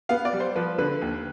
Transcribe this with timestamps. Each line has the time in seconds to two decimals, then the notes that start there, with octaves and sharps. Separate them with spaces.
0.09 B3 F5
0.25 D5
0.33 G3
0.40 C5
0.55 F3 B4
0.78 D3 B4
1.02 D#2